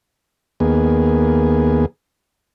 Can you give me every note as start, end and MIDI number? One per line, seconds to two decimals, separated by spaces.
0.60 1.86 39
0.60 1.86 58
0.60 1.86 59
0.60 1.86 68